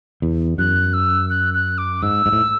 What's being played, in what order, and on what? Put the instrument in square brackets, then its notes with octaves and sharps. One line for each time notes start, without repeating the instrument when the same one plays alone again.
[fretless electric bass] E2
[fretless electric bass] F#2 [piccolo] F#6
[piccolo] E6
F#6
F#6
D6
[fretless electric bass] G#2 [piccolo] E6
[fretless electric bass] G#2
A2